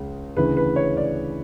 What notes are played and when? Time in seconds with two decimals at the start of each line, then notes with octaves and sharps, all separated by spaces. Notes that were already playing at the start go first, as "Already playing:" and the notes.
Already playing: C#2 C#3
0.37 D2 C#3 E3 B4
0.57 B4
0.76 C#5
0.97 D5